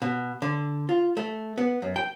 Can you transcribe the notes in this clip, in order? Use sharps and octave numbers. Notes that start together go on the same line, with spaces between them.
B2
D3
F4
A3
B3
F#2
G5